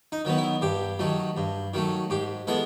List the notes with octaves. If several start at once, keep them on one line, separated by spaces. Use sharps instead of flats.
D#4
D#3 F#3 B3
E4
G2 G4
D#3 F#3 A3
G2
D#3 F#3 A3
G#2 G4
E3 G#3 B3 A4